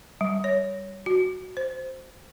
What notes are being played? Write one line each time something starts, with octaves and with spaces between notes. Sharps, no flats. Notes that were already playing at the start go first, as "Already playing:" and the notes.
G3
C#5
F#4
C5